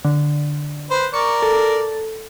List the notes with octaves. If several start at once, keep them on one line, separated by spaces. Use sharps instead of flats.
D3
B4 C5
A#4 D5 C#6
A4